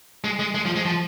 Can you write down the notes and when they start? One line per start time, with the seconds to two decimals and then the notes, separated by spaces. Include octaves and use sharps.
0.24 G#3
0.39 G#3
0.55 G#3
0.65 F3
0.76 G#3
0.85 F3